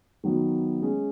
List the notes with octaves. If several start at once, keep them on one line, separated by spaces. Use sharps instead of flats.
D#3 F#3 B3 F#4
G#3 C#4 G#4